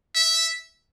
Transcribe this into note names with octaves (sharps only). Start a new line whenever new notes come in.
E5